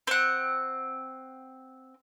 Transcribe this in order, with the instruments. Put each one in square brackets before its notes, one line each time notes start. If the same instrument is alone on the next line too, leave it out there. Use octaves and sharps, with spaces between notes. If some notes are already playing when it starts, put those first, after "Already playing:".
[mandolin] C4 F#5